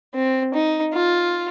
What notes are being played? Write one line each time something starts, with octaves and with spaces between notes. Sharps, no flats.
C4
D#4
F4